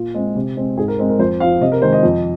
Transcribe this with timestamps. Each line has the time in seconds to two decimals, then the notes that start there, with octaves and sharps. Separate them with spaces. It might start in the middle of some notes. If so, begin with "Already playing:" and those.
Already playing: A#2 F4
0.14 G#3 C4
0.35 C3
0.57 G#3 C4
0.77 G#2 G#4
0.88 A#4
0.99 G#3 C4
1.09 A#4
1.19 F2 C5
1.40 C4 F5
1.44 F3
1.61 C3 D#5
1.72 A#4
1.82 D#3 G#3 C5
1.93 D#5
2.03 F2